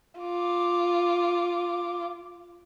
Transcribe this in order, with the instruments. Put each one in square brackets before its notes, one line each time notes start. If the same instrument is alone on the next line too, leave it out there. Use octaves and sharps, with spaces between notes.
[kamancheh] F4 D6